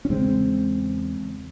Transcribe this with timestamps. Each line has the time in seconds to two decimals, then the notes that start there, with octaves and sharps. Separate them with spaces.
0.05 C#4
0.10 E2 C#3 G#3 C4